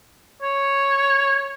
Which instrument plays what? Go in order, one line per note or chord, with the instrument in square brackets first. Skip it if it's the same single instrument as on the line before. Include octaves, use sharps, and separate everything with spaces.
[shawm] C#5